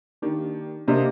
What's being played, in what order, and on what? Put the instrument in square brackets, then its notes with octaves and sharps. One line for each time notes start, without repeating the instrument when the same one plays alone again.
[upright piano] D#3 [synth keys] A#3 D4 G4
[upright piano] C3 [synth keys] A#3 D4 G4 A#4 D#5